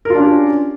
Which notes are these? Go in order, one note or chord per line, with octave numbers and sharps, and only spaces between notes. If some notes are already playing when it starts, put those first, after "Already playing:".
C#4 D4 F4 G4 A#4